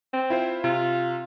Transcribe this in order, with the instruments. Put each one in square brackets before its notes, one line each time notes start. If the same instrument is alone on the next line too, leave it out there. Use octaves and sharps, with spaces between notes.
[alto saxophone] C4
[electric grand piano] E4 F4 C5
[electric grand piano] C3 [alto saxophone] F4